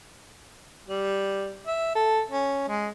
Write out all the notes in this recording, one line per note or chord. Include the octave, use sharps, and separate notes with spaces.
G3
E5
A4
C#4
G#3